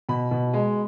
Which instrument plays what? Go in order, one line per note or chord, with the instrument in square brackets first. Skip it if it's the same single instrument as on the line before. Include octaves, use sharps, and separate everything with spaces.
[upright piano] B2 B5
B2
G#3